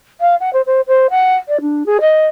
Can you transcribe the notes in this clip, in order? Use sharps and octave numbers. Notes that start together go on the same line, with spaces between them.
F5
F#5
C5
C5
C5
F#5
D5
D4
G#4
D#5